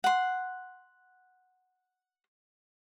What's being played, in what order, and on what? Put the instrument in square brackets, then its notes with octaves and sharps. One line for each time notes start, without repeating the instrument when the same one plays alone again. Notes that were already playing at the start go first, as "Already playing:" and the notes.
[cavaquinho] F#5 C6